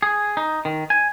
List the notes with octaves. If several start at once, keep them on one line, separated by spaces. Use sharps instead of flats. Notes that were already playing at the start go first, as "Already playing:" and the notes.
G#4
D#4
D#3
G#5